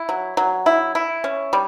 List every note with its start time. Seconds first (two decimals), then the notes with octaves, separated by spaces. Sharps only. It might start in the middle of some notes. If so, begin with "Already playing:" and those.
Already playing: E4
0.09 F#3
0.37 F#3
0.66 E4
0.95 E4
1.24 C#4
1.53 G3